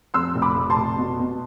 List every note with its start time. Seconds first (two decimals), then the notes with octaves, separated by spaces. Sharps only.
0.14 F2 C6 E6
0.35 F1
0.42 B5 D6
0.56 F1
0.70 A5 C6
0.77 F1
0.98 B2
1.19 B2